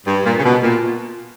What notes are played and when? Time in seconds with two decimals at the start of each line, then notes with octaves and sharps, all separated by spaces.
0.07 G2
0.25 A#2
0.38 C#3
0.44 B2
0.63 A#2